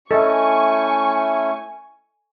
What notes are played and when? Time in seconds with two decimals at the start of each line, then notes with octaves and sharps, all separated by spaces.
0.11 A3 C#4 E4 A4 D#5 G#5 C#6